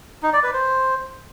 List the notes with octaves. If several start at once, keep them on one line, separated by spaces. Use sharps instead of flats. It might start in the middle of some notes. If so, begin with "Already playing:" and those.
D#4
D5
B4
C5